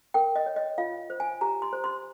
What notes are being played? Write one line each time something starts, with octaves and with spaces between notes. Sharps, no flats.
A#4 G5
D#5
C#5
D#5
F4 F5
C5
G#5
G4 A#5
C6
C5
C6